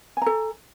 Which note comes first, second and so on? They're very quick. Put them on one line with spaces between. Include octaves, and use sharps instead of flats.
G#5 A#5 A4